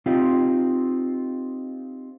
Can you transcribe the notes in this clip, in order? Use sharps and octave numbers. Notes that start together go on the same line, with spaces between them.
C4 D#4 F4 G4